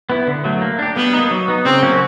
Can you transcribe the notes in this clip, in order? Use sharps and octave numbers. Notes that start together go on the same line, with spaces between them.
B3 E4
D3
F#3 A3
A#3
D4 G4
G3 B3
D#4
A#3
F#3
B3 D#4
C#3 C4
F#3 A#3 C#4 F#4